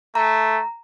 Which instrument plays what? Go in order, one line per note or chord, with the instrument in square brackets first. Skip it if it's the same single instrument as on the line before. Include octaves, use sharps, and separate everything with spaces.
[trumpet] A3 [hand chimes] A#5